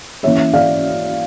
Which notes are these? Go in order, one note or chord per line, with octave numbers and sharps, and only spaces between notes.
E3 A#3 C#4 C#5 E5
D5 F5